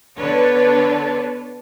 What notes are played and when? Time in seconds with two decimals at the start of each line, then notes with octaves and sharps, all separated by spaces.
0.17 D3 B3 D4 A4 B4 C#5